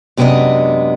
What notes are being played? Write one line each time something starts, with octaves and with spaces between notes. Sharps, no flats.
F#2 C3 G#3 B3 D4 D#5